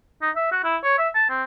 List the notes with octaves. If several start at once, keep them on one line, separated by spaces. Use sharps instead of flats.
D#4
E5
F#4
E4
C#5
E5
A5
C4